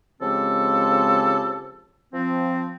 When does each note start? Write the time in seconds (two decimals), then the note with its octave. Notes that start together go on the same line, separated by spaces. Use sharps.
0.21 C#3 F3 G#3 C4 G4 A4
2.13 F3 C4